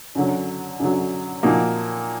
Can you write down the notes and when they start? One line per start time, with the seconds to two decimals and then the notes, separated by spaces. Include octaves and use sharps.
0.15 F#2 D3 F#3
0.79 F#2 D3 F#3
1.43 A#2 F3 A#3 D#4 F#4